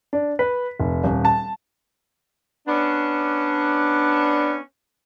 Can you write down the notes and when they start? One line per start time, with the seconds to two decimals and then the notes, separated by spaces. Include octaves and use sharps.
0.13 D4
0.39 B4
0.80 F1
1.04 D#1
1.25 A5
2.67 B3 C#4 D4